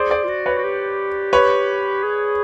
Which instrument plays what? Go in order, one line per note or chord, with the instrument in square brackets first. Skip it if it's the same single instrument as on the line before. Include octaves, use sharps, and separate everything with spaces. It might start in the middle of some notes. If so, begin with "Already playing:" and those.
Already playing: [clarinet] G#4 [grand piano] C5 D5
[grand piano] C5 D5
[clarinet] F4
F#4
[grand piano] B4 C#5
[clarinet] F#4
G4
[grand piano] B4 C#5
[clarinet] G#4